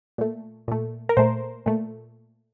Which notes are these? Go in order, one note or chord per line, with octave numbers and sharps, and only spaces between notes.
A#2 A3
A#2 A3
A#4
A#2 A3 C5
A#2 A3